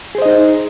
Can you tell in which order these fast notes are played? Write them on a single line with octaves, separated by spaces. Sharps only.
G#4 C5 D#5 D#4